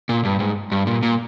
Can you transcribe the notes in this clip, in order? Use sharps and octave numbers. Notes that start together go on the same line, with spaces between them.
A#2
G2
G#2
G2
A#2
A#2